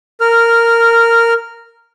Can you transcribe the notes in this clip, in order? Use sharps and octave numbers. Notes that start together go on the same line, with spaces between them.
A#4 F6